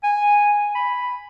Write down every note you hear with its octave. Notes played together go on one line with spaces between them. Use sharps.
G#5
B5